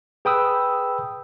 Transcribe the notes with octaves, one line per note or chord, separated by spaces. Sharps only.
G#4 B4 G5 B5 D#6 E6